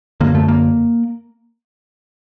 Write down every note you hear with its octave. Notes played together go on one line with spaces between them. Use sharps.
F#2 D3 A#3
A3
A#3